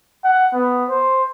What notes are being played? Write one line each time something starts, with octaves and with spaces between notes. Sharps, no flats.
F#5
B3
C5